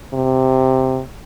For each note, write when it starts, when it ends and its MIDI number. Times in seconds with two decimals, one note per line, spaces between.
0.13 1.01 48